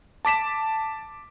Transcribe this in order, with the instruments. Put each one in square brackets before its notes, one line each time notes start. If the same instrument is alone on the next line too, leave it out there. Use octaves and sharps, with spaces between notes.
[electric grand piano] A5 D6 B6 E7